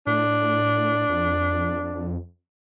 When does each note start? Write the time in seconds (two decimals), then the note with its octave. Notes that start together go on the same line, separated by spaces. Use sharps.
0.07 A2 D4
1.10 F2